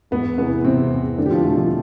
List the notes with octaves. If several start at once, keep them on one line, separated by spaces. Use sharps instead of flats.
E1 B3
E2 C3 B3
E1 C3 C4
E2 C3
F1 D3 D4
G4
F3 F4
E2 B2 A3 A4
F3 F4